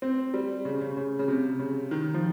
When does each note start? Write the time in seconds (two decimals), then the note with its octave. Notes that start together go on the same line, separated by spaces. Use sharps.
0.02 C4
0.34 G3
0.65 C#3
0.81 C#3
0.97 C#3
1.19 C#3
1.28 C3
1.59 C#3
1.91 D#3
2.14 F3